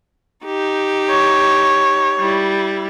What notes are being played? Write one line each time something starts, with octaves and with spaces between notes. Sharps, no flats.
D#4 G4
C#5
G3 E4